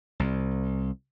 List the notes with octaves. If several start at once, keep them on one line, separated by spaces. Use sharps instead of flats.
C2